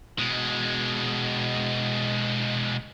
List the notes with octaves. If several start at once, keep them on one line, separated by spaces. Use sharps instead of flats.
B2 G#3